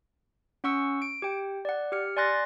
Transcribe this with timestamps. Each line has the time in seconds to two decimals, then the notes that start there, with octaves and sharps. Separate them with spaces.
0.64 C#4 F#5 C#6 E6 C#7
1.02 D7
1.22 G4 G5
1.65 D5 F#5
1.92 G4 F6 C#7
2.17 D5 G#5 C6 F#6 A6 A#6